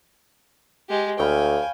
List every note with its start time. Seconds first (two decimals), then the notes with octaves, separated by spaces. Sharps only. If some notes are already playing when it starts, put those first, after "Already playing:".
0.89 G#3 G4
1.19 D2 C#5 F5 G5 G#5 B5